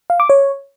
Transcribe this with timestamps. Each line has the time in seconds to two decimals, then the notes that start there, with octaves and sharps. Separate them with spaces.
0.10 F5
0.20 D6
0.30 C#5